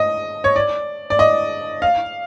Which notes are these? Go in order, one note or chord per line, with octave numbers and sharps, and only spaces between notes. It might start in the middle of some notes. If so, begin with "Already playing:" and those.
Already playing: D#5
C#5
D5
D5
D#5
F5